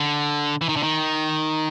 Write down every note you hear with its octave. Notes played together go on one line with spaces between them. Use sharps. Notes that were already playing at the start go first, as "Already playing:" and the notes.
Already playing: D3
E3
D#3
D3
D#3